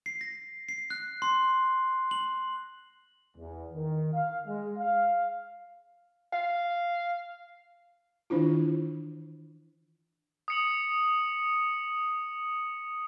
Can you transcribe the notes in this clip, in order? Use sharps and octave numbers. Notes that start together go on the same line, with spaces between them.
C7
A#6
C7
F#6
C6
F#7
E2
D#3
F5
G#3
F5
F5
D#3 E3 D4 E4 F4
D#6 C#7 F#7